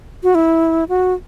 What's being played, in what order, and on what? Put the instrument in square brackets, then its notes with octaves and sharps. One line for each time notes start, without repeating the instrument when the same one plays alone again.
[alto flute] F#4
E4
F#4